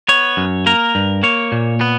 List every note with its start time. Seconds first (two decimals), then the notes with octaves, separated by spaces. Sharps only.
0.08 B3 C#5
0.37 F#2
0.66 A#3 A#4
0.95 G2
1.23 A#3 C#5
1.52 A#2
1.81 B3